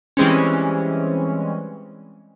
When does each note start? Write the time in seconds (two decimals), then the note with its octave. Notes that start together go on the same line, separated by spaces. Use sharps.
0.17 E3 G3 G#3 C4 C#4